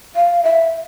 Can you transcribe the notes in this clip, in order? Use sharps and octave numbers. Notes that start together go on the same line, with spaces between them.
F5
E5